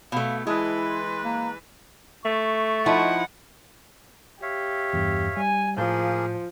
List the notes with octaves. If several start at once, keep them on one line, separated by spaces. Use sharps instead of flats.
B2 A3 F5
E3 G#3 E4 B4 A5
C6
A#3 A#5
A3 C#6
F3 D#4 E4 F#5
G4 C#5 E5 F5
E2 G2
G3 G#5
A2 F3 A#3 G#4 A5 G6